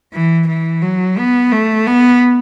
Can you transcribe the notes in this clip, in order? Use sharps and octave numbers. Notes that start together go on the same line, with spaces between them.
E3
E3
F#3
B3
A3
B3